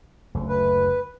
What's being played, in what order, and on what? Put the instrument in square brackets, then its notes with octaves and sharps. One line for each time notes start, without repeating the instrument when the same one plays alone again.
[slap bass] F#1 D2 A3
[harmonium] B4